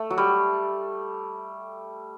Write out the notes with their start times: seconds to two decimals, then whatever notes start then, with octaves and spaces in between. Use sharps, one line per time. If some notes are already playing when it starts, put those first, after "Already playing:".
Already playing: A3
0.10 F#3
0.18 G3